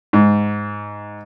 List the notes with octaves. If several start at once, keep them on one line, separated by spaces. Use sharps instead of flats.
G#2